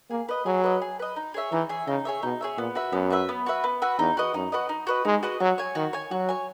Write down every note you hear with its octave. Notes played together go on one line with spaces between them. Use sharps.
A#3 G#4
B4 D#5
F#3 G#4
B4 D#5
G#4
B4 D#5
D#4
G#4 C#5 E5
E3 D#4
G#4 C#5 E5
C#3 D#4
G#4 C#5 E5
B2 D#4
G#4 C#5 E5
A#2 B3
F#4 B4 E5
F#2 B3
F#4 B4 E5
B3
F#4 B4 E5
B3
F#4 B4 E5
E2 D#4
F#4 B4 D#5
F#2 D#4
F#4 B4 D#5
D#4
F#4 B4 D#5
G#3 D#4
F#4 B4 D#5
F#3 F#4
C#5 G#5
D#3 F#4
C#5 G#5
F#3 F#4
C#5 G#5